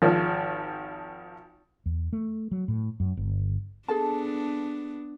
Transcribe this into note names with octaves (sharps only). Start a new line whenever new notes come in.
G#1 F3
E2
A3
F#3
A2
F#2
G1
B3 D4 G#4 A4 A5